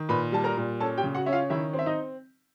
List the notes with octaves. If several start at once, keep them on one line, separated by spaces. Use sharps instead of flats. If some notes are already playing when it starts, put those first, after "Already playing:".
Already playing: D#3
A#2 B4 B5
G3 A5
A#4 A#5
A#2
C#4 A4 A5
G4 G5
C#3
F#4 F#5
C#4 E5
F4 F5
D#3 E4 E5
C4
E5
D#4 D#5